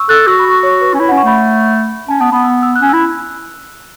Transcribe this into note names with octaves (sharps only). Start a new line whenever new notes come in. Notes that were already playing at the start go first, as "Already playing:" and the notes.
Already playing: C#6 E6
A4 F#6
F#4 E6
B5
C#6
C#5
B4
C#4
E4 C#5
C#4 F#5
C#6
A3 B5
C#4 A5
B3 A5
B3 B5
E6
E6
F#6
C#4
E4 E6